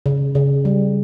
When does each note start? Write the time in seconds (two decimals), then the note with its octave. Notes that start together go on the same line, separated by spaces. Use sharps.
0.06 C#3
0.35 C#3
0.65 G3